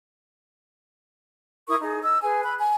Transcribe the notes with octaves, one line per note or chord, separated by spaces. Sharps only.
E4 A#4 C#6 D#6
D#4 G#4
D#5 E6
G#4 B4 G#5
B5 F#6
G#5